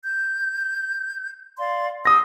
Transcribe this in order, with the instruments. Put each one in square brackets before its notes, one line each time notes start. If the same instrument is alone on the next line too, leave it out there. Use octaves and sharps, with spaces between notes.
[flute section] G6
D5 F5 C6
[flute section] G4 C6 E6 [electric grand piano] D#6 A#6